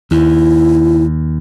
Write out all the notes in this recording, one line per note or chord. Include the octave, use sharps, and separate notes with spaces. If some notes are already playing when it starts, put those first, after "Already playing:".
D#2 E4